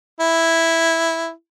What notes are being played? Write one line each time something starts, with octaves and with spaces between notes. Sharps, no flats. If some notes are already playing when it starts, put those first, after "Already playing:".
E4